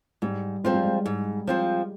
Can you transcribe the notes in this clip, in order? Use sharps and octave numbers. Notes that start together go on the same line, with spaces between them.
G#2 G3
F3 G#3 C4 F4
G3
G#3
G#2
F3 C4 F4